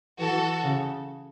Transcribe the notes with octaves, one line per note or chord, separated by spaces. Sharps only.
E3 F#4 A4
C#3